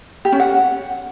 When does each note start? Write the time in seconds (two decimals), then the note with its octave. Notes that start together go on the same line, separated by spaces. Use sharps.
0.25 G4
0.32 C#4
0.40 F#5